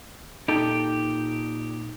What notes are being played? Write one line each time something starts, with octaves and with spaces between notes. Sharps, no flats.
A#2 D#4 G4 A4